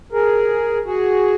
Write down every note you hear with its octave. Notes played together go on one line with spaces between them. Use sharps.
G#4 A#4
F#4 G#4